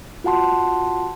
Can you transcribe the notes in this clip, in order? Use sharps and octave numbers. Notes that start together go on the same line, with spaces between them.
F4 F#4 F#5 A5 C6